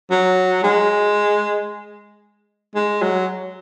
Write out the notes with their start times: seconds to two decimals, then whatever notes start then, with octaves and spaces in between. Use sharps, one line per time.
0.11 F#3
0.63 G#3
2.75 G#3
3.02 F#3